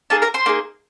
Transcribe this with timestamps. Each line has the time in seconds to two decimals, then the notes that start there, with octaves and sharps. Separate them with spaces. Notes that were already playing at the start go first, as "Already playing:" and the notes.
0.10 A#3 D#4 G#4 A4 A5
0.22 A#4 A#5
0.34 C5 C6
0.46 A#3 D#4 G#4